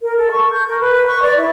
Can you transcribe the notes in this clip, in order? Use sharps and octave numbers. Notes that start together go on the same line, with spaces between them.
A#4
A4
C#6
G6
A#4
B4
C#6
D5
E4